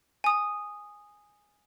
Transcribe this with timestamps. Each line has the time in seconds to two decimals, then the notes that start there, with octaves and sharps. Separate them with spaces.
0.24 G#5 D#6